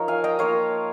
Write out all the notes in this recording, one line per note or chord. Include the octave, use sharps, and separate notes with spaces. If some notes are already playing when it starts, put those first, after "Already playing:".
Already playing: F3 D#4 A#4 C#5
F5 G#5
D#5 G5
A#3 F4 C#5 F5